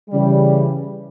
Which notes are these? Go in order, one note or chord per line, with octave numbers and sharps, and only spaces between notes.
C#3 E3 G3